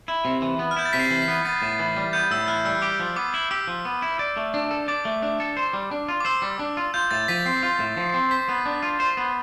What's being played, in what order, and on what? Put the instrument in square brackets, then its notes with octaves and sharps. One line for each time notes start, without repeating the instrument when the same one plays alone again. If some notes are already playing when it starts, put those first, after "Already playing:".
[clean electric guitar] E4
C3
E3
B3
[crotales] F6
[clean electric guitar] E4 [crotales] G6
[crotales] A6
[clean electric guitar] C3 [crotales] B6
[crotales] C7
[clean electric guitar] E3
[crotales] B6
[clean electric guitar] B3
[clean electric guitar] B3 [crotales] A6
[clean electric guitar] A2
E3
G3
[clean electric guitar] B3 [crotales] G6
[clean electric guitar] A2 [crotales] E6
[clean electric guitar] E3 [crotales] F6
[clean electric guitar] G3 [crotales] E6
[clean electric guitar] G4 [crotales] D6
[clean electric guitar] F3
[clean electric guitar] B3 [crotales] D6
[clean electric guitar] E4
[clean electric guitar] G4 [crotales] E6
[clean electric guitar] F3
B3
E4
D5
A3
D4
A4
[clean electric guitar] D5 [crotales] D6
[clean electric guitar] A3
D4
A4
C5
G3
D4
F4
[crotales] D6
[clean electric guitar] C5 [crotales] E6
[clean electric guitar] G3
D4
F4
[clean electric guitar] F4 [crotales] G6
[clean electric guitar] A2 [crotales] A6
[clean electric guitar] F3 [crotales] B6
[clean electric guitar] C4 [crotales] C7
[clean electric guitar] F4
A2
F3
C4
[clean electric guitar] C5 [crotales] B6
[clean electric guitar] B3
D4
F4
C5
B3